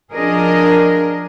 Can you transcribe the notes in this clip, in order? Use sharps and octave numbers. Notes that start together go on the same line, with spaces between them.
F3 D4 G#4 A#4 D#5